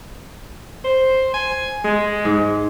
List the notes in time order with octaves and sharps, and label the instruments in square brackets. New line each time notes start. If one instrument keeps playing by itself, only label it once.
[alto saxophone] C5
G#5
G#3
[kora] G#2